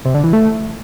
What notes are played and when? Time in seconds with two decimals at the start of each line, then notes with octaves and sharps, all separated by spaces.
0.05 C3
0.14 D3
0.24 E3
0.33 A3